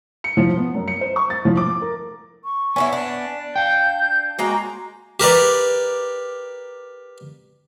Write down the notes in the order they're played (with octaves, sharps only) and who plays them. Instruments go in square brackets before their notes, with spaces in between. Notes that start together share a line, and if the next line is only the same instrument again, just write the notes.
[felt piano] C#7
F3
B3
F#2
C#7
C5
C#6
A6
F3
D6
A#4
[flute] C#6
[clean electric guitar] B3 G#5 [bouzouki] C#4 D4 E4
[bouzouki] D4 [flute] D5
[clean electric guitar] F5 G5 [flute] G6
[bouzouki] G#3 A#3 A#5 [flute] F#4
[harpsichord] G4 A#4 B4 D5